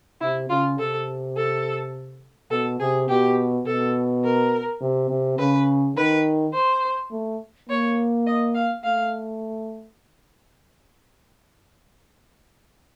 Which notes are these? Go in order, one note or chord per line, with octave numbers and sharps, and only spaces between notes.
C3 E4
C#3 F4
C3 A4
A4
B2 A4
C3 G#4
B2 G4
B2 A4
A#4
C3
C3
C#3 B4
D#3 B4
C5
A3
A#3 C#5
D#5
F5
A3 F5